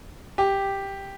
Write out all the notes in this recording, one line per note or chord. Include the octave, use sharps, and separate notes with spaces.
G4